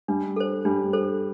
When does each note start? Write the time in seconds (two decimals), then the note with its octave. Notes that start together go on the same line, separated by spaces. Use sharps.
0.08 G3 D4
0.36 A4 C5
0.65 G3 D4
0.93 A4 C5